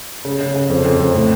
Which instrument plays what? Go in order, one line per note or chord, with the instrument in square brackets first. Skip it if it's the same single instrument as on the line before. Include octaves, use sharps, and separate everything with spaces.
[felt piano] C#3
C#3
C#3
F2
F2
F2
A2